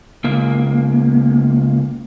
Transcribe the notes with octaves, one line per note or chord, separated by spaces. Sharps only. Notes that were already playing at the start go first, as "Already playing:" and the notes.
C#2 A#3